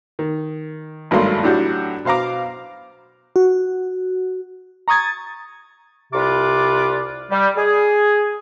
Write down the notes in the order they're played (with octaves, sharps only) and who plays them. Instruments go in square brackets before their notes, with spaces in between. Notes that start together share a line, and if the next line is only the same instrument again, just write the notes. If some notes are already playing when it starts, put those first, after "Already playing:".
[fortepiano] D#3
G#1 G2 F#3 A3 A#3 C6
A2 F#3 D4 F#4 G4
B2 C5 F5 A#5 D6
[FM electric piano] F#4
A#5 C#6 D#6 G#6 A6
[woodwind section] C2 C3 F4 B4 D6
G3
G#4